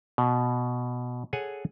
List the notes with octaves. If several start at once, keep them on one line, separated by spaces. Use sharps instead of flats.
B2
G#4 A4 C#5 F#5 G#5